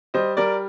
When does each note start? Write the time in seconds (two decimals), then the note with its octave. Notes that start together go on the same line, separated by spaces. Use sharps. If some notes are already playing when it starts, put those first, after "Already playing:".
0.14 G3 C5 D#5
0.37 G3 A#4 D5